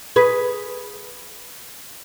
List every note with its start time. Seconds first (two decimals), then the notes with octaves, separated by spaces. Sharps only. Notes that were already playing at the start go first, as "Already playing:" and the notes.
0.16 G#4 B4